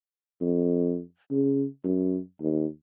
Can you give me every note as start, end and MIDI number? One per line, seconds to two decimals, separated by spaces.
0.41 1.00 41
1.31 1.65 49
1.84 2.18 42
2.40 2.66 39